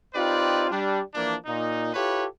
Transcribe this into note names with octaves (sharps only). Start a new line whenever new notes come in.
C4 D#4 F4 G4 B4 D5
G3 D4
E3 F3 A#3 D4
A#2 D#4
E4 F4 G4 A4 B4 C#5